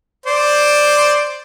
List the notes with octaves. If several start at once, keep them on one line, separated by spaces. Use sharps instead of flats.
C5 D5